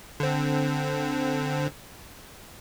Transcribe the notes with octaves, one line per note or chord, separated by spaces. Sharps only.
D3 C4